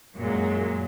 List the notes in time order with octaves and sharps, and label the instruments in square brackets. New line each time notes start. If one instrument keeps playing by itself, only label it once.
[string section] F#2 A#2 F#3 G#3